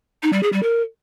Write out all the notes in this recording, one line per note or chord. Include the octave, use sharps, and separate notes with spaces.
D#4
G3
G#4
G3
A#4